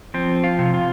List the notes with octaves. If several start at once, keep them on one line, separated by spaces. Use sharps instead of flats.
F3 C4
F4
C3
F4